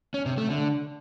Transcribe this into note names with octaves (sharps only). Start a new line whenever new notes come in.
C#4
C3
A3
D3